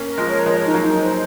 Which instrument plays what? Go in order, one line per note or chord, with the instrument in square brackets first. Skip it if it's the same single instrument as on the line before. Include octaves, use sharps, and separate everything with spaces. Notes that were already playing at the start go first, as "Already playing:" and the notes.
Already playing: [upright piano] A#3 C#4
[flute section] A#4
[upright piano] F3 G#3
[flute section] C#5
[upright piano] F3 G#3 [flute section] A#4
[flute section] D#4
[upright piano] F#3 A#3
[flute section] D#4
C5